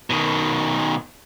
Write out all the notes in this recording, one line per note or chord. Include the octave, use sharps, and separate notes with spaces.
B2 D#3